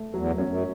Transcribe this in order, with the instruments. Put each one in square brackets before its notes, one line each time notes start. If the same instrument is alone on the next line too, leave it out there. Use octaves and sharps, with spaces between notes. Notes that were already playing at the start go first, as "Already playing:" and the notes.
Already playing: [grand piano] A3
[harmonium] E2 [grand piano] F#3
[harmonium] F#2
[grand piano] C#4
[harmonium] F#2